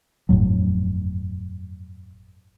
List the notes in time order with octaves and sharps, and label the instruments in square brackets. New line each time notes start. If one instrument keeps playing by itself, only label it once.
[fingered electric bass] G1 F2 A2 F#3